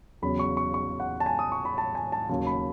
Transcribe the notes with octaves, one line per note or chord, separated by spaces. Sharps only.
E2 C#3 F#3 B5
C#6
C#6
C#6
F#5
A5
G#5
D#6
C#6
B5
A5
G#5
A5
D#2 C#3 F#3 A5
B5